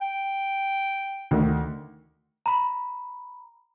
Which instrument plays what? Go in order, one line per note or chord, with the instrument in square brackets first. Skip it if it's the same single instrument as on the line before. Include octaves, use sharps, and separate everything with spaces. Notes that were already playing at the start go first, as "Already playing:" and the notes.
[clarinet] G5
[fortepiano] D2 D#3
[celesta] A#5 B5